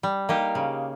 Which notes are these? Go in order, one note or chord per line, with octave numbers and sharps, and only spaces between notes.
G3
A#3 D#4 G4
C#3